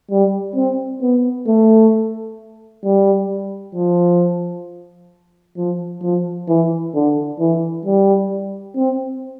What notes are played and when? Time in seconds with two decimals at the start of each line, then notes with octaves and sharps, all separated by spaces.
0.11 G3
0.56 C4
1.02 B3
1.47 A3
2.84 G3
3.75 F3
5.57 F3
6.02 F3
6.48 E3
6.94 D3
7.39 E3
7.85 G3
8.76 C4